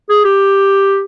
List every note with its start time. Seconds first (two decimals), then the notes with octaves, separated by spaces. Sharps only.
0.09 G#4
0.24 G4